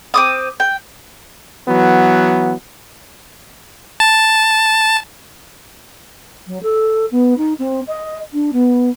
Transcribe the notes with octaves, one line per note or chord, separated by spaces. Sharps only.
C4 D6 D#6
G5
E3 F#3 B3
A5
F#3
A4
B3
D#4
C4
D#5
D4
B3